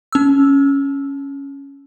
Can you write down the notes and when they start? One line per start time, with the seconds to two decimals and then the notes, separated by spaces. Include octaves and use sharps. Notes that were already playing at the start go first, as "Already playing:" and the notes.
0.12 C#4 E6